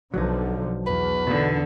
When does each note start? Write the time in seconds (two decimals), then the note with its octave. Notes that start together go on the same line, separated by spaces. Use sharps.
0.14 B1 D3 F3 F#3 D#4
0.86 E2 B4
1.27 B2 D3 D#3 B3